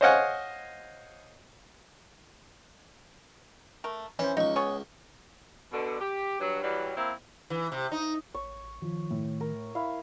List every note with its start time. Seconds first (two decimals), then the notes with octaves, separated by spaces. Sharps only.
0.01 C5 C#5 D#5 F5 F#5 G#5
3.84 A3 A#4
4.19 E3 C#4 C5
4.37 C#2 D#4 C#6
4.56 B3 G#4 C#5
5.72 B2 D3
5.99 G4
6.39 G2 F#3
6.62 E3 F#3 G3
6.97 A#3 C4 E4
7.50 E3
7.72 C3
7.92 D#4
8.34 A1 C#5
8.82 D#3 F3
9.11 A2
9.41 A#4
9.75 E4 F5